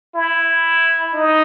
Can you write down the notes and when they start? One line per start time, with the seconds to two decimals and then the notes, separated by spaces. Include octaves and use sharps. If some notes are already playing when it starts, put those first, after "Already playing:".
0.15 E4
1.14 D#4